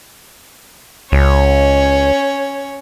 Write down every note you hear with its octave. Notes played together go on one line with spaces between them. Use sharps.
C#2 C#4 C#5